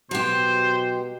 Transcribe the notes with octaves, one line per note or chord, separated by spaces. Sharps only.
B2 F#3 G4 C5